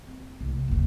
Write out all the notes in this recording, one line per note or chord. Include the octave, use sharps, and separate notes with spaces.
C4
C2 A2
F#1 D#2